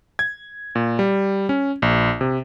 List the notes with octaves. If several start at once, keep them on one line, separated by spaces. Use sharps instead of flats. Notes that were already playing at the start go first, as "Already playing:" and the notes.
G#6
A#2
G3
C#4
A#1
C3